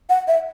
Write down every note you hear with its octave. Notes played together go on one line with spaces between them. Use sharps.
F#5
E5